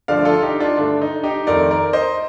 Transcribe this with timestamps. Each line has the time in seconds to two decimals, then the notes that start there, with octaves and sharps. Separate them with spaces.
0.08 G2 D3 F3 A3 D5 F5
0.25 F4 A4
0.43 D#4 G4
0.60 D4 F4
0.77 G2 D3 A3 D4
1.02 D#4
1.24 D#4 G4
1.47 F2 D#3 A3 A#4 D5
1.71 A#4 D5
1.93 C5 D#5